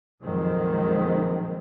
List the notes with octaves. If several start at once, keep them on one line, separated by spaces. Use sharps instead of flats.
A#1 F2 D#3 F#3 G#3 C4